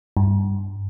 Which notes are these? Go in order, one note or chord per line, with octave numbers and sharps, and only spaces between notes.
G2